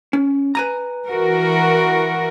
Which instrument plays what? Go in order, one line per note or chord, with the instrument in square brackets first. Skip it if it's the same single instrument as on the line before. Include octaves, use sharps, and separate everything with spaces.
[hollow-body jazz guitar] C#4
B4 G#5 A#5
[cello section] E3 F#4 A#4